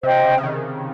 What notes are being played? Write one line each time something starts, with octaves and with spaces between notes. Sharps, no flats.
C3 C5 D#5 G5
C#3
C#3
D#3